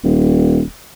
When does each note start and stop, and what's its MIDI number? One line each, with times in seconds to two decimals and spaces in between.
0.04 0.62 27